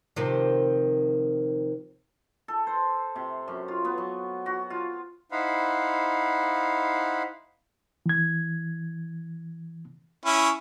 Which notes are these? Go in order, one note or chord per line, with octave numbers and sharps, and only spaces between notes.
C3 D#3 F3
A4
C5
C3
F#2
F4
B3
F#3
F#4
F4
D#4 E4 C5 F5 F#5 B5
E3 G#6
C#4 E4